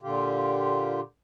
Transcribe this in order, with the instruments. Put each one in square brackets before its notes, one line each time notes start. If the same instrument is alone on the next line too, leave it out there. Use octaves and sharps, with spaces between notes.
[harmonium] A#2 D3 F4 G4